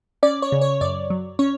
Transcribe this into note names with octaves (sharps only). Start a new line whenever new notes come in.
C#4 D5
C#5
C#3
C#5
F#2 D5
F#3
C#4 C#5